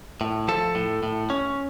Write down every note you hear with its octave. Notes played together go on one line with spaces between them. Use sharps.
A2
F3 A4 A5
A2
A2
C#4